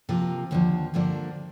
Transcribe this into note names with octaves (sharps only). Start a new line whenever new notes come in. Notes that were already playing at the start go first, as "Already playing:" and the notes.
C3 F3 A#3 F4
D#2 D3 F3
G2 D3 F3 A#3 D4